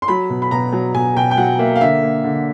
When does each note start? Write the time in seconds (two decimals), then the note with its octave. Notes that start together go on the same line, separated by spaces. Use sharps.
0.02 C6
0.08 F#3 B5
0.30 B2
0.42 B5
0.51 B2 A#5
0.72 F#3
0.94 B2 G#5
1.16 B2 G5
1.31 G5
1.37 F#3 F#5
1.59 A#3 E5
1.76 F5
1.81 D3 E5
2.03 A#3
2.24 D3